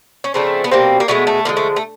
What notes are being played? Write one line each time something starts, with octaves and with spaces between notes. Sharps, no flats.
C#4
C#3 F3 A3 C4 D4
B3
B2 G3 A#3 C4
A#3
B2 G#3 A3 B3
A3
D3 F3 G#3 A#3
A3
A3